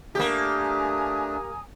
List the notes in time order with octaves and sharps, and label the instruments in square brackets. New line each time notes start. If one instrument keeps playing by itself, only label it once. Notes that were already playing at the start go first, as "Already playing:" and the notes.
[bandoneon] A3 D4 [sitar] A#3 G4 [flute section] G#5 A#5 D#6